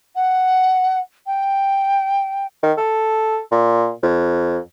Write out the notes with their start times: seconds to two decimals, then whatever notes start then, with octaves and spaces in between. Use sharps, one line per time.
0.15 F#5
1.26 G5
2.63 D#3
2.78 A4
3.52 A#2
4.03 F2